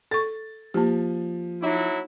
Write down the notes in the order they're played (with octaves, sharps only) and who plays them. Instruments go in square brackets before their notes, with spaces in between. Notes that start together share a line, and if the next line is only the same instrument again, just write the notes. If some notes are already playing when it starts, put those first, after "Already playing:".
[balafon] A4 C#6 [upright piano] A6
[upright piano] F3 [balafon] A#3 G4
[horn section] F#3 E4 [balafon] D#4